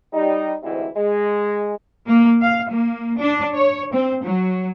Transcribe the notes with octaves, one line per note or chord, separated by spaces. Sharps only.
G3 D#4
D2 G#2 C3 E3 E4
G#3
A#3
F5
A#3
D4
C#5
C4
F#3